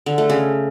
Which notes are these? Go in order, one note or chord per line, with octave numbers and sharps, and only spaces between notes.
D3
A3
C#3